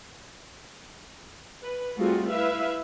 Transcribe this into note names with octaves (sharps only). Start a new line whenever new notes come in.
B4
G3 A3 C4 F4 F#4 G#4
E4 B4 E5 F5